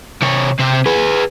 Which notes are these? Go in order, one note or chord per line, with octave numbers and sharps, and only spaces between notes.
C3 C#5
C3 C4
G#4 B4